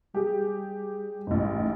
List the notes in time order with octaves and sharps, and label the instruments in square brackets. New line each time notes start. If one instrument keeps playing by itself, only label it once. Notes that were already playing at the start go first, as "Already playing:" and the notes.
[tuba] G3 [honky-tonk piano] G4 G#4
[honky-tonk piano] A1 G#2